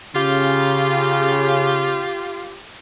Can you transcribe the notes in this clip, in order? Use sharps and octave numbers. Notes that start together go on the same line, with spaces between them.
C#3 F4 G4